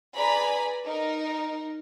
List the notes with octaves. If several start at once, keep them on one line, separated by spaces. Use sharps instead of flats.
G#4 B4 D5 G#5 A#5 B5
D#4 A#4